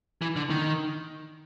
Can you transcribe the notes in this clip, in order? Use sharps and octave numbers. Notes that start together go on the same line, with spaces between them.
E3
D3
D#3